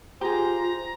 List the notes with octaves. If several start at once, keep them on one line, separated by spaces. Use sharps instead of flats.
F4 G4 G#4 C5 A#5